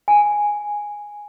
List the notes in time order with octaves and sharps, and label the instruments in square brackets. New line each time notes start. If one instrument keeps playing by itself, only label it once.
[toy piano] G#5